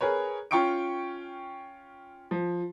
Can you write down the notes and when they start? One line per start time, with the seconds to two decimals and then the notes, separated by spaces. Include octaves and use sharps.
0.01 G#4 A#4 B4 C#5
0.51 C#4 F4 G5 C#6 C#7 D7
2.31 F3